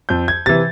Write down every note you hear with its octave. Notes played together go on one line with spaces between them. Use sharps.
F2 G6
G#6
C3 E3 A6